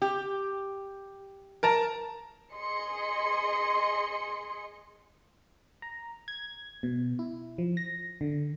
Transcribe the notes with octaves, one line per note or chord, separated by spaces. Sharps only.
G4
A#4 A5 A#5
G#4 D#5 C6 C#7
A#5
G#6
B2
E4
F3
A#6
D3